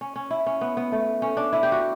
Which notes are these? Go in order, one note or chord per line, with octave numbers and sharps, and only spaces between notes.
C#4
C#4
E4
C#4
B3
B3
A3
C#4
D4
E4
G4
F#4